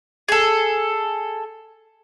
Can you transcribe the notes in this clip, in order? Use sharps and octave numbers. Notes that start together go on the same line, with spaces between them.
G#4 A4